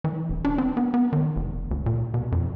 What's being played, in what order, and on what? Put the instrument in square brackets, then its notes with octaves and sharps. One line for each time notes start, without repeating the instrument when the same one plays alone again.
[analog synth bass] E3
E1
D4
C4
B3
B3
D#3
F1
D2
A#2
B2
F2